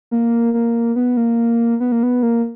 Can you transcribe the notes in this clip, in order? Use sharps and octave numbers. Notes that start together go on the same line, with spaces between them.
A#3
A#3
B3
A#3
B3
A#3
B3
A#3